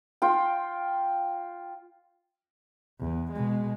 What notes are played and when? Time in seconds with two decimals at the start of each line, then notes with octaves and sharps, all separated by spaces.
0.22 F4 G5
3.00 E2
3.32 B2 G#3